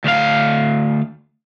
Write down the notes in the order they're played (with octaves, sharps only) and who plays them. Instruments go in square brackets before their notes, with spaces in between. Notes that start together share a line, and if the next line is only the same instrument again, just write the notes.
[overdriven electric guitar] D2 F5